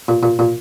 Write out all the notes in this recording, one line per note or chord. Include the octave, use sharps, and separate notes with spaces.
A#2
A#2
A#2